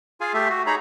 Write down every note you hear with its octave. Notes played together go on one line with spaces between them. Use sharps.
F4 G#4 F5 G#5
A3 G4 A4 E5
F#4
D#4 G#4 C#5 A#5 B5